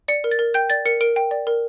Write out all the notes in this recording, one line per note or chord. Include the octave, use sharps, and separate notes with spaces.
D5 C#7
A#4
A6
A#4
G5 G6
D5 A6
A#4 C#7
A#4 D7
G5
D5
A#4